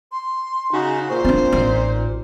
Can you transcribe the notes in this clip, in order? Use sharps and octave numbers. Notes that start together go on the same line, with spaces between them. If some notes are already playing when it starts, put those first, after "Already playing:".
C6
C#3 D#4 F#4
A#2 C5
C4 D4
A1 D#4